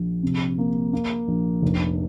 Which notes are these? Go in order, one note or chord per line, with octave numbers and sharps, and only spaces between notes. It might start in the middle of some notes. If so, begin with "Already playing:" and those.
Already playing: A#1
C3
A#3
A#3
A#1
F1